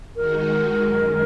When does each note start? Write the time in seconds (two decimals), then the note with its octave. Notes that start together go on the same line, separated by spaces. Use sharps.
0.16 D#3 G#3 D#4 F#4 A#4
0.82 F#2 D#3 G#3